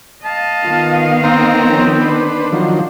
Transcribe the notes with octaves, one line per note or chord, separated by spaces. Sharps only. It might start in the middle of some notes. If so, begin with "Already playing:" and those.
D#5 F5 A5
D#3 B3 F4
C4 C5 A#5
F3 C#4
D4 B4 C5
D#3 F3 F#3